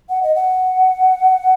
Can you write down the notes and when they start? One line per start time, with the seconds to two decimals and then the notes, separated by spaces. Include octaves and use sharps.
0.10 F#5
0.23 D#5
0.35 F#5